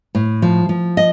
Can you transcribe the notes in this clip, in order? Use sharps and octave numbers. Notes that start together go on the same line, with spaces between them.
A2
F3
F3
D#5